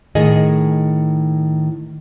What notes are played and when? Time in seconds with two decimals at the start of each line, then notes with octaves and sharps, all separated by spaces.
0.15 A2 D#3 G#4 D#5